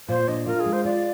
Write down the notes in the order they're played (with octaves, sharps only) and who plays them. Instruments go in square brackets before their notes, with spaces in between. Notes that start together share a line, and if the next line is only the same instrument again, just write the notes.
[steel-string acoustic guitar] A#2 [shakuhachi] C5
[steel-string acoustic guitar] D4 [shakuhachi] D#5
[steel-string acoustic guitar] F4 [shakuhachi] A#4
[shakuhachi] G#4
[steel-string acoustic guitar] G#3
[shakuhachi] C5
[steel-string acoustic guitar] F4 [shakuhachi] D5